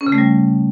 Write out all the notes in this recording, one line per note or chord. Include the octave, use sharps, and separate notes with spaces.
C#4
C#3
A3
G3